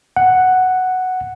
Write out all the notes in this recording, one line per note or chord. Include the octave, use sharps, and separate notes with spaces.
F#5